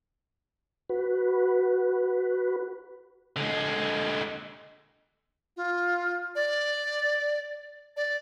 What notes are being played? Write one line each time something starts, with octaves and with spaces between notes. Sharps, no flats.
F#4 B4
D3 G#3
F4
D5
D5